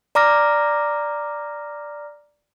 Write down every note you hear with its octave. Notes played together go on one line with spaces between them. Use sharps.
D5 A#5 D6 F6 A#6